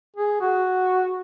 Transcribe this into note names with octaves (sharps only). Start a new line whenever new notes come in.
G#4
F#4